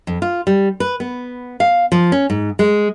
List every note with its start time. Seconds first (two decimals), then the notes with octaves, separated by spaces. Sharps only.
0.07 F2
0.22 F4
0.47 G3
0.80 B4
1.00 B3
1.60 F5
1.92 F3
2.12 C#4
2.30 G#2
2.59 G#3